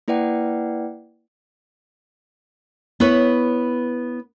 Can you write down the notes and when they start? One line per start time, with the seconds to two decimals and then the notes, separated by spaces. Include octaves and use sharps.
0.08 A#3 E4 B4 D5 F#5 G5
3.00 B3 E4 B4 C#5